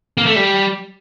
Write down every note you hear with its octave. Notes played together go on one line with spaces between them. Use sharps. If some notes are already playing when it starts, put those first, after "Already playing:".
A#3
A3
G3